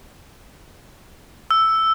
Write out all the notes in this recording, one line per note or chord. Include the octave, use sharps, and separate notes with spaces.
E6